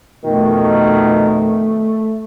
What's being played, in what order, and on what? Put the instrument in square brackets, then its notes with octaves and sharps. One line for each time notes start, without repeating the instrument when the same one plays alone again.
[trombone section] F2 B2 D#3 [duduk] A3